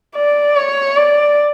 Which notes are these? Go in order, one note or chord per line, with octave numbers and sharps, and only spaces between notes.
D5
C#5
D5